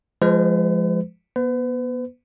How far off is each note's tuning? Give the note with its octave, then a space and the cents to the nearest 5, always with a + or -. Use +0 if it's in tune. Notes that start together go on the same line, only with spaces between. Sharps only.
F3 -5 G#3 +0 B4 +45
B3 -30 B4 +40